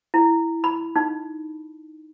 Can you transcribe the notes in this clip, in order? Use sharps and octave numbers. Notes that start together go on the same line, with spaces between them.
E4
B5
D#4